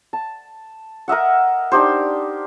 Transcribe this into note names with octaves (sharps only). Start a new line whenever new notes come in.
A5
A#4 D#5 E5 F#5
D4 D#4 G4 C5